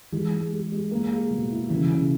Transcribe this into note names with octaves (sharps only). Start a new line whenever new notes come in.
E3 G#3
G#3
G#3
G#3
A#3
G#4
B2
E4
C#3 E3
C#3